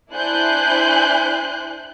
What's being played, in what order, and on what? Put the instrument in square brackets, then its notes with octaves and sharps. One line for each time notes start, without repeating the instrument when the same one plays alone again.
[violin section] D4 E4 C5 G#5 F#6 G6